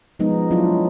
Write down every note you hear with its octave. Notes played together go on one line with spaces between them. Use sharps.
F3 G#3 B3 D#4
F#3 D4 E4 F4